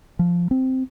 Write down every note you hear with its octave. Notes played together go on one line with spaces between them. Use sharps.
F3
C4